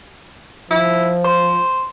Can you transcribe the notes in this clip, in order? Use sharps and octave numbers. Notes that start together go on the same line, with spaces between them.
F3 E4
C5